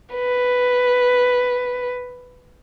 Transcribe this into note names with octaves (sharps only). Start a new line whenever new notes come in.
B4